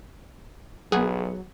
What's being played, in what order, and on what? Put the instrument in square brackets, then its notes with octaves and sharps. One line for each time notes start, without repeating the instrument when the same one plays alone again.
[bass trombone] B1 [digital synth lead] F#3 [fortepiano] B3 F#5 [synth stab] G#4